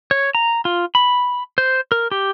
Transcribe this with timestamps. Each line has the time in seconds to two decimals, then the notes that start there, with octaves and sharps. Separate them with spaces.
0.11 C#5
0.35 A#5
0.65 F4
0.95 B5
1.58 C5
1.92 A#4
2.11 G4